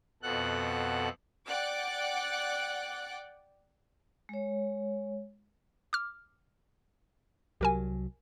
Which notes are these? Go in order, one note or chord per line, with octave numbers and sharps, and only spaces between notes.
F2 B2 A4 F#5 F#6
D5 F#5 G5 D6 F#6
G#3 C#5
D6 F6
C2 F#3 G4 A#4 G#5